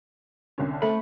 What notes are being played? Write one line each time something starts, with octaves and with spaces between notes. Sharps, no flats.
C2 D3 C#4
A3 A4 C5 E5 B5